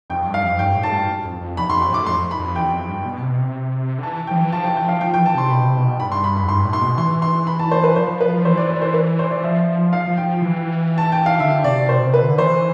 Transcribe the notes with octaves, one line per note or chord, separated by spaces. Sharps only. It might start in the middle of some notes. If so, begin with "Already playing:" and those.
F2 G5
G2
F5
F2
G2 G5
A2
A5
G2
F2
F2
E2 B5
E2 C6
F2
C6
A2 D6
F2 C6
B5
F2
E2 G5
F2
G2
B2
C3
B2
C3
D3
E3 A5
G5
F3
E3
F3 A5
G5
E3
G5
F3 F5
F3 G5
G5
E3
A5
C3 C6
B2 B5
C3
B2
G2 B5
C6
B5
B5
F2
G2 C6
A2
C6
B2
E3 C6
C6
B5
A5
C5
B4
F3 C5
B4
F3
E3 C5
D5
C5
C5
B4
C5
D5
E3
F3 E5
F3 F5
F3
G5
E3
A5
G5
F5
D3 E5
C3 D5
B2 C5
B2
C3
B4
D3
E3 C5